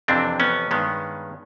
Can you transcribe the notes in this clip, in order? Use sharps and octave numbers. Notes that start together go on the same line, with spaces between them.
F2 C3 E3 C4 D4
B3 C#4
G2 D#3 G#3 B3